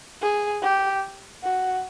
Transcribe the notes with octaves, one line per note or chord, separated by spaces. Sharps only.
G#4
G4
F#4